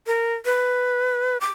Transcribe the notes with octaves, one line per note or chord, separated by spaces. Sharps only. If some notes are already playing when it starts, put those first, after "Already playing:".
A#4
B4
D6